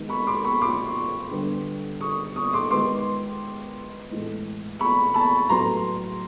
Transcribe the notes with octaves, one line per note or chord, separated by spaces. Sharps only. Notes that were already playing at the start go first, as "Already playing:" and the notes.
Already playing: D#3 G#3 B3
B5 C#6
C6 D6
B5 C#6
C6 D6
D3 G3 B3
C#6 D#6
C#6 D#6
C6 D6
D#3 G#3 B3 C6 D6
A2 E3 G#3 B3
B5 C#6
A5 B5
A2 F#3 B3 A#5 C6